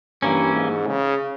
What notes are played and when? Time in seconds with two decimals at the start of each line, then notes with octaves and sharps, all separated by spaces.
0.22 G2 E3 A#3 C#4
0.54 G#2
0.87 C#3